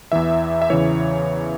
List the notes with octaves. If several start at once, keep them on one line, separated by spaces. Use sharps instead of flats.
E2 E3 E5
E5
E2 C#3 E3 C#5